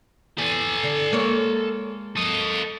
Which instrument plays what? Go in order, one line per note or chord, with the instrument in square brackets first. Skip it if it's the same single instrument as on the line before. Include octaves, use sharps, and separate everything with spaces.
[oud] E2 [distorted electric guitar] A4 G#5
[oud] D3
G#3 A#3 C#5
[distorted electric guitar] A4 D#5